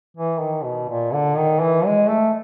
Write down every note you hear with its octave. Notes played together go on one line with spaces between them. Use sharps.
E3
D#3
B2
A#2
D3
D#3
E3
G#3
A3